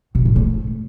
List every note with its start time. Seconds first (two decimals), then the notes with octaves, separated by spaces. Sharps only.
0.15 B2
0.25 A2
0.36 A3